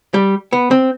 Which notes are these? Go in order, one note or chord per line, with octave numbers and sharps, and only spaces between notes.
G3
B3
C4